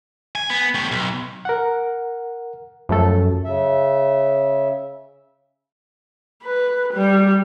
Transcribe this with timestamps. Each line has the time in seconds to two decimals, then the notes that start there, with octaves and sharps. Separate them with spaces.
0.35 G#5
0.50 B3
0.75 A3 G4
0.92 B1
1.45 A#4 F#5
2.89 F#2 F3 A3 A4
3.45 C#3 E5
6.44 B4
6.94 G3